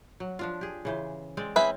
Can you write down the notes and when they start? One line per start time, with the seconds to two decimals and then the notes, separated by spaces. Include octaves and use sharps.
0.20 F#3
0.39 F3 D4 F4
0.61 G4 G#4
0.85 C#3 E3 C5
1.37 G#3 C4 D5
1.56 C4 C#4 E4 G#4 B4 E5